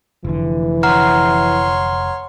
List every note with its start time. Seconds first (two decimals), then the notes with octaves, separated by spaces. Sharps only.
0.25 F1 D3 E3
0.83 C#5 F#5 A#5 C6 F6